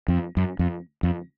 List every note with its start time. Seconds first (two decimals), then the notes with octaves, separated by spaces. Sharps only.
0.08 F2
0.37 F#2
0.59 F2
1.03 F2